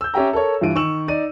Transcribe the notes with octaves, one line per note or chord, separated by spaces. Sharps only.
E6 G6
C#4 G4 E5 G5 A#5
A4 A#4 C#5
G2 E3 F4 D7 D#7
D#3 C#6 E6 E7 F#7
D#4 D5 D#7